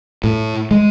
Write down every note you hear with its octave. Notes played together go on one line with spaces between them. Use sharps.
A2
G#3